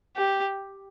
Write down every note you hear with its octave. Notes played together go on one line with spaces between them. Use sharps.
G4